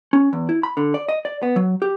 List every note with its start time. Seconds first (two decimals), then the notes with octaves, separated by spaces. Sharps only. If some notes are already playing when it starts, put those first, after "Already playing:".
0.13 C#4
0.33 E2
0.49 E4
0.63 B5
0.77 D3
0.94 D5
1.09 D#5
1.25 D5
1.43 B3
1.56 F#3
1.82 G4